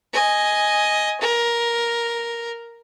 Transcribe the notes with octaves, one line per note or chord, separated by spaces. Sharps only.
D#5 G#5
A#4